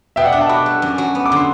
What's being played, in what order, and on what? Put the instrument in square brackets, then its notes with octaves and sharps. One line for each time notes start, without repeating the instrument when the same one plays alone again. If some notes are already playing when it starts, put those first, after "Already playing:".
[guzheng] B2 [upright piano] E5 G5
[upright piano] D5 F#5
[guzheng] D4 [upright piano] E5 G5
[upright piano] F#5 A5
[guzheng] F#4 [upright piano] B5 D6
[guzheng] A3
F#2
F#3
B3
[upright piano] D6
[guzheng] D3 [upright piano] C6